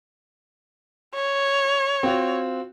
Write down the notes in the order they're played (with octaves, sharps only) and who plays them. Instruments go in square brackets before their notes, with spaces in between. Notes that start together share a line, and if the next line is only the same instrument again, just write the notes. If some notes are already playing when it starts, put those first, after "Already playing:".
[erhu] C#5
[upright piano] C4 F4 F#4